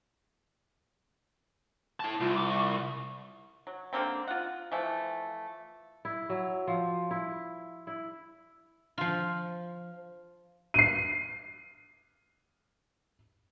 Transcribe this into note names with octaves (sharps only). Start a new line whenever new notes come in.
E4 A5
C2 F4
D6
C#6
F#3
D3 G3 A#3 C4
F4 F#5
E3 F3 A3
E4
F#3
F3
E4
E4
F3 F4
C7 D#7